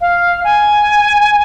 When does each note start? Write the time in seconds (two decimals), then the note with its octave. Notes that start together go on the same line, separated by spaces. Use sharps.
0.01 F5
0.44 G#5